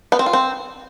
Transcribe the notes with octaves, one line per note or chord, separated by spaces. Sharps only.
B3
C4
F4
C4